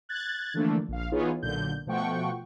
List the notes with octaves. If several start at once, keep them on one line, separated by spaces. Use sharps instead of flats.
F#6 G#6 A6
D3 E3 F3 A3 A#3 D4
A#1 F5
E3 B3 D#4 F4 G#4 C#5
B1 A#2 D3 G6
B2 F3 A3 F#5 G5 C#6